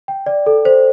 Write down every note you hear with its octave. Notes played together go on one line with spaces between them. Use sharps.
G5
D5
A4
C5